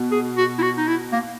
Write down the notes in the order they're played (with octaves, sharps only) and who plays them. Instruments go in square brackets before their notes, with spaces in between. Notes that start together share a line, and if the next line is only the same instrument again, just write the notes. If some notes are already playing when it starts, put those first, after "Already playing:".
Already playing: [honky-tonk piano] B2
[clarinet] G#4
F#4
E4
F#4
D#4
E4
A#3